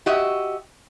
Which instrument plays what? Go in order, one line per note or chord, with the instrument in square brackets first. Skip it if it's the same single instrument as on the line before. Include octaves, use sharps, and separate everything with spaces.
[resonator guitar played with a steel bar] F#4 G4 D#5 E5